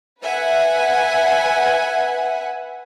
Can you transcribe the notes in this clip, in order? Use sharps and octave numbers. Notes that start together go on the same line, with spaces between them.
B4 E5 F#5 G#5